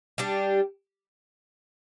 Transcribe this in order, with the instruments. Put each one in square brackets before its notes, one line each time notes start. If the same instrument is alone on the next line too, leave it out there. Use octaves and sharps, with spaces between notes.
[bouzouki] G3 D4 G4